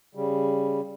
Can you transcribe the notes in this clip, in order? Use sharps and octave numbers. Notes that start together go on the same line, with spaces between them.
C#3 G3